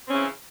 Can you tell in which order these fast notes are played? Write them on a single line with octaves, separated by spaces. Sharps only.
C4 C#4 C#3 E3